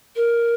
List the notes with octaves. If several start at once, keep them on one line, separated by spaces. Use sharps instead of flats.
A#4